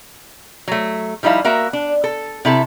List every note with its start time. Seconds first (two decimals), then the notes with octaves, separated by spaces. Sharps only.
0.68 F#3 A3
1.23 F3 G3 D#4 E4 F5
1.45 A#3 F#4 A#4 E5
1.73 D4
2.04 A4
2.45 C3 E4 A4